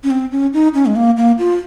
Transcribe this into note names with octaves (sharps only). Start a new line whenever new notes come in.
C#4
C4
C#4
D#4
C#4
G#3
A#3
A#3
F4